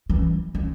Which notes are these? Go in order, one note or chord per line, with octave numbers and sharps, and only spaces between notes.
E3
D#3